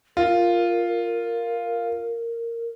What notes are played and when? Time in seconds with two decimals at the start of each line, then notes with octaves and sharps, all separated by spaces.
0.17 F4 A#4